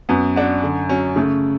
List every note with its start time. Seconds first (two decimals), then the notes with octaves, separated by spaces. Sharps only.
0.09 F#2 B3
0.36 D4 F#4
0.63 D3
0.89 F#3 C#4
1.16 C#3 A3